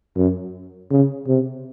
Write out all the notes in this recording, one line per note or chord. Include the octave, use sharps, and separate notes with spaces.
F#2
C#3
C3